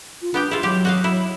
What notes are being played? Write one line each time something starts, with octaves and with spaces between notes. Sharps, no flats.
F4
B3 D4 G4 G5
E4 F4 G#4
F#3 G4
F#4 D#5 F5
E4